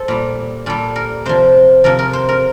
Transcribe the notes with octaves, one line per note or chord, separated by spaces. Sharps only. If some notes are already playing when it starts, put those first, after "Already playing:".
Already playing: A4 C5
A#2 G3
A#2 G3 A4
A#4
C3 F3 C5
C3 F3 A#4
A#4
C5
A#4